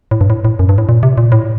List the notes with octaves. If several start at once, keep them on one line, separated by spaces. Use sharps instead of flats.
A2
G2
A2
A2
F#2
G2
A2
A#2
C3
A#2
A2